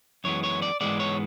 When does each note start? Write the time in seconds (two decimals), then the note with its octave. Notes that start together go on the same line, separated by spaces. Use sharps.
0.24 F#2 E3 G#3 B3 C#5
0.44 C#5
0.62 D5
0.81 G#2 E3 G#3 B3 D5
1.00 C#5